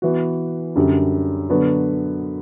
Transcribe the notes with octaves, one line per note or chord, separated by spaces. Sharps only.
E3 B3 F#4
F#2 D3 G3
D3 F#3 B3 F#4